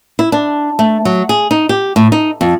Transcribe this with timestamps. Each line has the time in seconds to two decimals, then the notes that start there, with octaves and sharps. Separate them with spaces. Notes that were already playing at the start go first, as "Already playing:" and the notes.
0.19 E4
0.32 D4
0.79 A3
1.05 F#3
1.29 G#4
1.51 D#4
1.69 G4
1.96 A2
2.12 D#4
2.41 F2